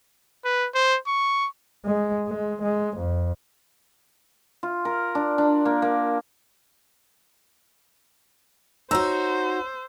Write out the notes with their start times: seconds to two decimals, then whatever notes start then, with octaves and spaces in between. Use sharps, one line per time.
0.45 B4
0.75 C5
1.07 C#6
1.86 G#3
2.28 G#3
2.62 G#3
2.97 F2
4.63 F4
4.85 A#4
5.15 D4
5.38 D4
5.65 A#3
5.82 A#3
8.91 D#4 F#4 C5 C#5 A#5 E6